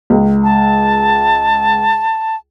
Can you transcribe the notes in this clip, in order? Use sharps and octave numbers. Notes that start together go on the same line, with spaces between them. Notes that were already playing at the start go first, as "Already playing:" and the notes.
C#2
A5